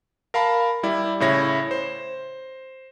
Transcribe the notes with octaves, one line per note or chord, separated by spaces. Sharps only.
A#4 F5 A5 B5
G3 E4 D5
A2 C#3 E4 C#5 A#6
C5